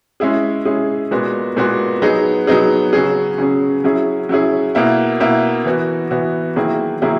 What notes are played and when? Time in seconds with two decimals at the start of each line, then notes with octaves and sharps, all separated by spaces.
0.20 G#3 C#4 E4 G#4
0.65 G#3 C#4 E4 G#4
1.11 A#2 G#3 B3 F#4
1.57 A#2 G#3 B3 F#4
2.02 F#3 B3 D#4 G#4
2.47 F#3 B3 D#4 G#4
2.93 C#3 F#3 C#4 G#4
3.38 C#3 F#3 C#4 G#4
3.84 F#3 C#4 E4 G#4
4.29 F#3 C#4 E4 G#4
4.75 B2 A#3 E4
5.20 B2 A#3 E4
5.65 E3 B3 F#4
6.11 E3 B3 F#4
6.56 D#3 F#3 A#3 E4 G#4
7.02 D#3 F#3 A#3 E4 G#4